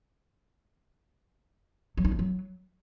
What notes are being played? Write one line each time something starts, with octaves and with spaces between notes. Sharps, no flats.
F#3
D#4
A3
F#3